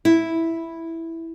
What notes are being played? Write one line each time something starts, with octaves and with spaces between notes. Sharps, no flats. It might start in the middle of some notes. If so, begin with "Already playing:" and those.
E4